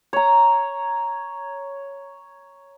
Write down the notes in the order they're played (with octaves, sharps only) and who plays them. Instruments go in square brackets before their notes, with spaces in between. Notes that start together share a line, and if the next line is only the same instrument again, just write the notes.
[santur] C#5 A#5